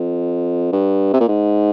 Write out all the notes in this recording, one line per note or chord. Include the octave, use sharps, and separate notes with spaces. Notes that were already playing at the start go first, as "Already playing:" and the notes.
Already playing: F2
G2
C3
A#2
G#2